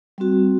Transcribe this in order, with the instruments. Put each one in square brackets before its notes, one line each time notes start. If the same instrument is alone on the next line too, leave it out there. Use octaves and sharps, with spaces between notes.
[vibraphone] G3 C4 F#4